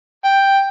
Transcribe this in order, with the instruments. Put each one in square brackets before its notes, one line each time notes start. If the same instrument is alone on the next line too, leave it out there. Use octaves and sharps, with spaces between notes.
[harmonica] G5